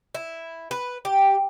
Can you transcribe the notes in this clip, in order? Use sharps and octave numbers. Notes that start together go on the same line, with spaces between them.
E4
B4
G4